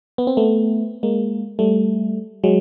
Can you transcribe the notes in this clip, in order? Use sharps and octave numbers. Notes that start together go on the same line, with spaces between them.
B3
C4
A3 B3
G#3 A#3
G3 A3
F#3 G#3